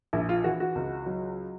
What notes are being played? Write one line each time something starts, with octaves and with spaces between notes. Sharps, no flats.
A#1 E4
F4
E3 F#4
F#4
C#2
F#3